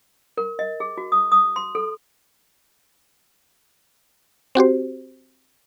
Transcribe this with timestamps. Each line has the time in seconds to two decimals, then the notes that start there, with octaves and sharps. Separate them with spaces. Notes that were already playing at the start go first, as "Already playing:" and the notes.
0.37 A#4
0.59 D#5
0.80 G#4
0.98 F#4
1.12 D#6
1.32 D#6
1.56 C6
1.75 A4
4.55 C4 F#4 G4 C5